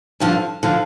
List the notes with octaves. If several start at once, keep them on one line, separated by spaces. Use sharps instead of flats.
G2 D3 F3
D3 F3